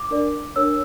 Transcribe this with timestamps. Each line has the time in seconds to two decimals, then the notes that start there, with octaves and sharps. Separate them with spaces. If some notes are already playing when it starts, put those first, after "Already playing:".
Already playing: D6
0.10 D4 A#4 D5
0.56 D4 A#4 C#5 E6